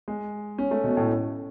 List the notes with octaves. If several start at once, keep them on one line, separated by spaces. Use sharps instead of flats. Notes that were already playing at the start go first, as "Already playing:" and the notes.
G#3
C#4
A3
B2
A2